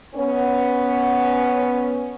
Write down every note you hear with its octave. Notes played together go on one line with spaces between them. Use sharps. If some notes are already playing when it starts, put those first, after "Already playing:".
B3 C#4